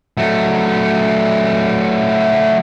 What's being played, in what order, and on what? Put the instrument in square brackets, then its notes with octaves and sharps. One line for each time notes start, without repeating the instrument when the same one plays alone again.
[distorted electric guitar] F#3 A3